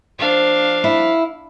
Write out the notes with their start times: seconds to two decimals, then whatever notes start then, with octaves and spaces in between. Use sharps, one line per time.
0.19 F3 A#3 D4 F5
0.84 E4